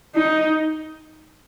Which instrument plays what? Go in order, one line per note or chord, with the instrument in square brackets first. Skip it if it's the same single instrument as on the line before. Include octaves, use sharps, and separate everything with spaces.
[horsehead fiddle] D#4